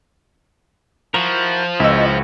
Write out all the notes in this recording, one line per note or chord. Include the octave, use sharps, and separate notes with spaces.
F3 E4 F#4 A#4
C#2 E4 F#4 D#5 E6